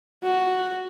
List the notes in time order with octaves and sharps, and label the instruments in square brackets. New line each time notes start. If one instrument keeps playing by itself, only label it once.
[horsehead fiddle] F#4